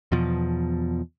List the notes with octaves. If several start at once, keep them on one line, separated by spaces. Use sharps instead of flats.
E2 B2 F3